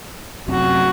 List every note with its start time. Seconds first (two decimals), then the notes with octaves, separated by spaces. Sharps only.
0.48 F#2 C3 F#4